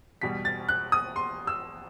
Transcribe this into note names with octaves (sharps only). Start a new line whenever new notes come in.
E2 B2 G3 B6
A6
F#6
D#6
C6
E6